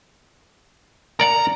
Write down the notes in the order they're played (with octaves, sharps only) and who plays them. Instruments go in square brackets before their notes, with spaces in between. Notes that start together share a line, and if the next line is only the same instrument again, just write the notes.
[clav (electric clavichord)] A#4 D5 F#5 [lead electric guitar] A#5